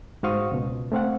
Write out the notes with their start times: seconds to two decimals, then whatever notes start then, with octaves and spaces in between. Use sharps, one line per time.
0.23 G#2 F#4 C5 F5 C#6 D#6
0.52 C#2 B2
0.92 A3 C4 F5 F#5